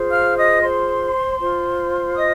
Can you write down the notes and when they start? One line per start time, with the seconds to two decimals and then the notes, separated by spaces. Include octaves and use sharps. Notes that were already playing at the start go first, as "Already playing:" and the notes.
Already playing: F4 G#4 C5
0.11 F5 F6
0.37 D#5 D#6
0.62 C5 C6
1.40 F4 C5
2.16 D#5 D#6